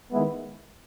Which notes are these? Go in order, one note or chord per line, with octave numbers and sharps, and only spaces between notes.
D#3 G#3 B3 E4